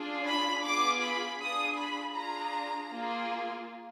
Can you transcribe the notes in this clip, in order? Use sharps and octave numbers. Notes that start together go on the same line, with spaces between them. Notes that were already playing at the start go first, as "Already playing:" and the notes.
Already playing: D4 F4 G#4
B5
B3 F4 G#4 D6
B5
D4 F4 G#4 D#6
B5
D4 F4 G#4 A#5
A#3 F4 G#4